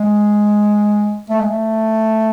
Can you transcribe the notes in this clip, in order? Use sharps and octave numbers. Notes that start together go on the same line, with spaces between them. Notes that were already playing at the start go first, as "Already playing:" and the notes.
Already playing: G#3
A3
G#3
A3